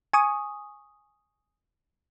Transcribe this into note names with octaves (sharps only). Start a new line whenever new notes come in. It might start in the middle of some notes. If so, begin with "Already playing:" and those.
G#5 C#6 D#6